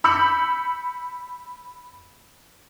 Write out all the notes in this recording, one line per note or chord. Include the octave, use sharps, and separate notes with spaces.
B5 E6 G6 C#7 F#7